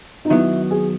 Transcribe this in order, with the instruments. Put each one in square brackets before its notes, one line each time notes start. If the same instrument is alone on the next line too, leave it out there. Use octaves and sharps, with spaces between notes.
[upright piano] D#4
[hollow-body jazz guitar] D#3 F#3 B3 [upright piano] E4
[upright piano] G#4